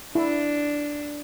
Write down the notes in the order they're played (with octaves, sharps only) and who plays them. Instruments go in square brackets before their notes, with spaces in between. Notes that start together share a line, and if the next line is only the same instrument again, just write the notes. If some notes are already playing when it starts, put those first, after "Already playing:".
[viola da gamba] D4 [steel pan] E4